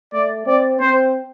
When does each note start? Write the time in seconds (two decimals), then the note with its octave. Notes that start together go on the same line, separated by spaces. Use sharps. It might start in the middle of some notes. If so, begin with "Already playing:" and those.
0.13 A3 D5
0.46 C4 D5
0.80 C4 C5